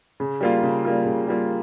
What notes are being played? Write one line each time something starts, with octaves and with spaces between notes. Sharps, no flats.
C#3
G3 A#3 F4
C#3
G3 A#3 F4
C#3
G3 A#3 F4